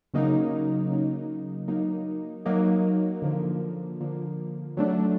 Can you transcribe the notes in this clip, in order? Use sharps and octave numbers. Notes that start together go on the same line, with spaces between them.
C#3 F#3 A#3 D#4
C#3 F#3 A#3 D#4
F#3 A#3 D#4
F#3 A#3 D#4
D3 F3 A#3
D3 F3 A#3
F#3 A3 D4